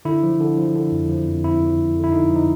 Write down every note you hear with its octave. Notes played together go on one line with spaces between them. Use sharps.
D3 E4
F3
D3
F3
D3
F2
F3
F2
F2 E4
F3
F2
D3
E4
D3 D#4
F3
D#4